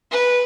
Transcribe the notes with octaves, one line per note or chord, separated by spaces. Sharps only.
B4